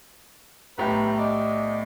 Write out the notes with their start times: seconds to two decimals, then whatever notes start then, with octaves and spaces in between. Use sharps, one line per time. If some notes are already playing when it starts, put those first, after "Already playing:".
0.78 B1 A2 G4 B4 A#5
1.17 D5 D#5